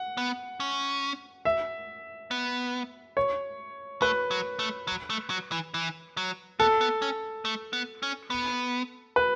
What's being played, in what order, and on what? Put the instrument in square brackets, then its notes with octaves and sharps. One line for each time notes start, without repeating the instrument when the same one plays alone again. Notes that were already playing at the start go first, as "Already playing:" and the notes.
Already playing: [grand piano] F#5
[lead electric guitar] B3
C#4
[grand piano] E5
[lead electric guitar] B3
[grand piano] C#5
[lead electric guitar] A3 [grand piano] B4
[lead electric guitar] F#3
A3
F#3
A3
F#3
E3
E3
F#3
[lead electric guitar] B3 [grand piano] A4
[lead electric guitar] B3
C#4
A3
B3
C#4
B3
[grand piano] B4